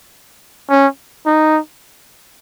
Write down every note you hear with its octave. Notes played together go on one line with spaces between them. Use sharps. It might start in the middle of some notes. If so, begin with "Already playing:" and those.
C#4
D#4